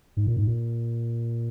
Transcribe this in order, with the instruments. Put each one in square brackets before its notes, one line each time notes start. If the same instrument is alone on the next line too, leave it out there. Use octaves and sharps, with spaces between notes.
[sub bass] G#2
A#2
G#2
A#2